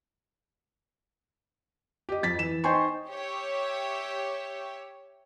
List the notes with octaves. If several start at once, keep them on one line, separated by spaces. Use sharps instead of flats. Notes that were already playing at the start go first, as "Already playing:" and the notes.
G4 D#5
F2 A6 B6
E3 E7
D#4 C5 G5 G#5 C6 C#6
G4 C#5 E5